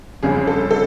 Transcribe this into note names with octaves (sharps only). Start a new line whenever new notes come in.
G1 F2 C#3 G#4
A4
A4